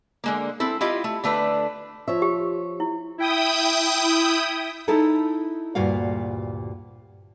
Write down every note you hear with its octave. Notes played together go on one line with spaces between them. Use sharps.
D3 G#3 A#3
C4 E4 A4
E4 F4 G4 D#5
A3
D3 A3 D4 B4
F3 C#5 E5
G4
E4
E4 G5 D#6
D#4 E4 A4 E5 A5
D2 G2 A#2 F#4 F5